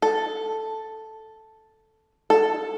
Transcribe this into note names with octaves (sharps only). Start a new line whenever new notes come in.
A4
A4